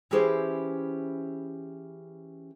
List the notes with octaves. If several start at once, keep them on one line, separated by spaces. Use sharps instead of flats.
E3 C#4 E4 G4 G#4 C5